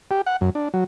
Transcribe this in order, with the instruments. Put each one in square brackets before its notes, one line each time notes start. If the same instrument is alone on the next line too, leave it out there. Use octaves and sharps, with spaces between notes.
[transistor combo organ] G4
F#5
F#2
D4
F#3